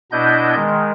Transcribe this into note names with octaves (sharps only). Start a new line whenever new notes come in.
B2 B3 D4 E4 D#5 G6
D#3 G#3